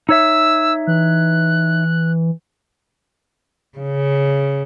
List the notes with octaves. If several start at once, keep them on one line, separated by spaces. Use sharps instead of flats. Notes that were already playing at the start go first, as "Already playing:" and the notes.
D#4 C#5 E5 E6
E3 F#6
C#3